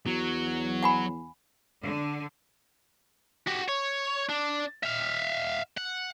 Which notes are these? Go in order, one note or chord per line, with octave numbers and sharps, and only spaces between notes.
E2 F#3
F#5 G#5 B5
D3
F#4 G4
C#5
D4
E5 F5
F#5